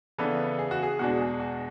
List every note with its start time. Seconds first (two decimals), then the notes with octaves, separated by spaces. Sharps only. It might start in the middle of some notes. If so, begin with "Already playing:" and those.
0.18 C#3 E3 B3 D4 A4
0.59 G#4
0.71 F#4
0.83 G#4
0.99 E2 B2 G#3 D4 F#4
1.21 G#4
1.40 F#4